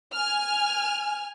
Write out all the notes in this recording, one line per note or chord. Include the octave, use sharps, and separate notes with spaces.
G#5 F6